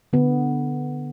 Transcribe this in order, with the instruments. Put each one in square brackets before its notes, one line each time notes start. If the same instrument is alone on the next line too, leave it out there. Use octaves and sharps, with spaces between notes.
[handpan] D3 B3